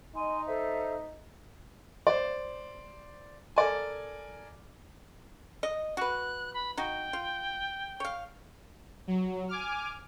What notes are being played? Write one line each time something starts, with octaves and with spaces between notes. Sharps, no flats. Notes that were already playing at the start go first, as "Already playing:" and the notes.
D#4 D#5 G#5 C6
A4 C5 E5
C5 D5
A4 A#4 D5 G#5
D#5
F#4 B4 F#6
B5
D#4 F#4 G5
F4
C#5 F5
F#3
G#5 D6 F6